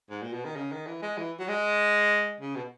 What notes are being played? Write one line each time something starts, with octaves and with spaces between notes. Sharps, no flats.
G#2
A#2
B2
D#3
C#3
D#3
E3
G#3
E3
F#3
G#3
C#3
B2